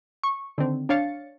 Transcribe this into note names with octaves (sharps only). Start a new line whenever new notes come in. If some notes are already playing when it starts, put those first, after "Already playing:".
C#6
D3 D#3 C4
D4 C#5 F5 A6 C#7